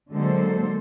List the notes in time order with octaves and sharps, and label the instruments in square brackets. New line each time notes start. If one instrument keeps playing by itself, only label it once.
[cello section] D3 F#3 G#3 A#3 A4 C5